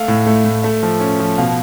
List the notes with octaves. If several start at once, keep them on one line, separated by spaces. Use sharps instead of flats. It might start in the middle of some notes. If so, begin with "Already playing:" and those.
Already playing: A3 F5
A2
A3
A2
A3 E5
F3
C#4
F3
B2 F5